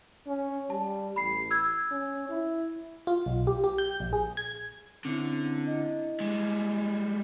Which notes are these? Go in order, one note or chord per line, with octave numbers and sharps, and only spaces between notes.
C#4
G3 A5
A1 B5 C7
E6 G#6
C#4
E4
F4
B1
G4
G4
G6
A#1
G#4
G#6
D3 C4 C#4 E4
E4 D#5
G3 G#3